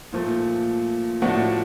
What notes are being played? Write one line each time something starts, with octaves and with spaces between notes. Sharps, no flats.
A#2 F3 A3
A2 F3 A3 D4 F#4